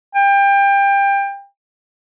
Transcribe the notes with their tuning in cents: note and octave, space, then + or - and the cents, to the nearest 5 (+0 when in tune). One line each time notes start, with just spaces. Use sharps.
G5 +25